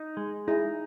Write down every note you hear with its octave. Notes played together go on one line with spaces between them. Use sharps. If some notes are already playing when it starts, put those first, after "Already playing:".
Already playing: D#4
G#3
D#4 E4 G#4